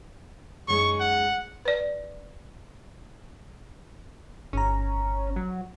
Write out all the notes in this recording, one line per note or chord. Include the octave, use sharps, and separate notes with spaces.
F#2 G#3 D#4 C#6
F#5
B4 D5
G1 C#4 A#5
F#3